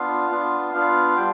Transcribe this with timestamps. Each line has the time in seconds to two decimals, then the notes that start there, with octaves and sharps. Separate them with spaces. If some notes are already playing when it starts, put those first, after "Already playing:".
Already playing: B3 D4 F4 F5
0.31 B3 D4 F4
0.74 B3 D4 F4 F5
1.17 G3 G5